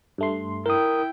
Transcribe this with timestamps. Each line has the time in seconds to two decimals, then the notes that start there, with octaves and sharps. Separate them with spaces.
0.18 G2 A3 C6
0.66 E4 A#4 G5 D#6